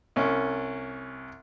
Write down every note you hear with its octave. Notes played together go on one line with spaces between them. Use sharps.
C2 C#4